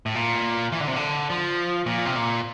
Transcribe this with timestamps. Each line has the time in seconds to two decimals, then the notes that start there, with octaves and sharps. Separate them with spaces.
0.06 A2
0.15 A#2
0.72 E3
0.81 D3
0.88 C3
0.96 D3
1.30 F3
1.86 A#2
2.06 C3
2.16 A#2